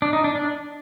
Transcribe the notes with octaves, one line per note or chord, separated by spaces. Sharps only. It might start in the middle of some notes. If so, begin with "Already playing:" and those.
D4
D#4
D4
D4